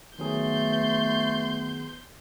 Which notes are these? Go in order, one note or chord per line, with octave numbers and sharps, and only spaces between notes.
D#3 F#3 A3 B3 G#4 C6 G6